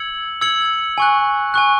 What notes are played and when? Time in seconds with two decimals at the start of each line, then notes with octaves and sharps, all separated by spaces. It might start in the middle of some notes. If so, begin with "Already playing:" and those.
Already playing: E6 G#6 C#7 F#7
0.41 E6 G#6 C#7 F#7
0.98 G#5 C#6 F#6
1.54 G#5 C#6 F#6